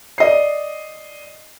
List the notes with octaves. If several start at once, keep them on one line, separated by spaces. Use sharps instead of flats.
D5 D#5 C7